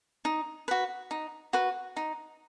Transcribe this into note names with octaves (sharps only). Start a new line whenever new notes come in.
D#4
F#4 B4
D#4
F#4 B4
D#4